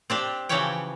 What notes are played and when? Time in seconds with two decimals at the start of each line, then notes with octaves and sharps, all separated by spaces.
0.10 C4 D4 G4
0.49 C#3 E3 F3 G4 C#5 G5